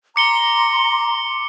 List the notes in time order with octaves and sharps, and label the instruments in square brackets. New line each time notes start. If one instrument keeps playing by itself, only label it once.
[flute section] A#5 C6 [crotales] D6 C#7 G7